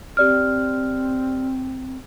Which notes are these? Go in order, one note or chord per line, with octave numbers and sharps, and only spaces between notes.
C4 G4 D5 F6